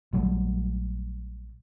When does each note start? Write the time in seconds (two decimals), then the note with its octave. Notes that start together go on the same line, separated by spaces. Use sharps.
0.13 A#1 F#3 G3 A3